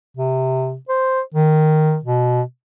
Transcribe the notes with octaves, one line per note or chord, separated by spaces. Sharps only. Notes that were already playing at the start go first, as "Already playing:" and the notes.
C3
C5
D#3
B2